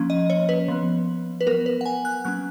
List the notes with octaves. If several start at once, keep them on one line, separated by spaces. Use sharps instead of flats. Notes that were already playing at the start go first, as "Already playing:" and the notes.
Already playing: F3 A#3 C#4
D#5
C#5
B4
F3 B3
B4
F#3 B3 A#4
B4
F#5
G#5
F#6
F#3 A#3 C#4 F#6